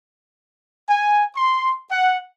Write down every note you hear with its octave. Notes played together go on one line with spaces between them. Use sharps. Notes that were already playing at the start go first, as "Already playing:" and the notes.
G#5
C6
F#5